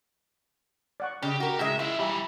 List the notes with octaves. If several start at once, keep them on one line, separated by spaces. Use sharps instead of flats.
D5 F#5 C#6
C#3 G4 D5 D#5
F#4 A#4
A2 C#3 G#3 D#5 E5 G5
E4 F4 E5
E3 G3 G4 E5 A#5